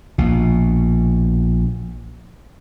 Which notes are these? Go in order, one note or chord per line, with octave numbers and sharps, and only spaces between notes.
A#1 B2